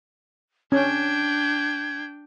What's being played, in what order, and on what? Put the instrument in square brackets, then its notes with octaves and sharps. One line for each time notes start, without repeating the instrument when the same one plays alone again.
[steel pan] C#4 [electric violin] D4 G5 [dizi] G#6